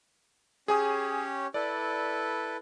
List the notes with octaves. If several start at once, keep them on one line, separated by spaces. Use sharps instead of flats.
C#4 G4 G#4 C#5 G#5 D#6
E4 A4 B4 D5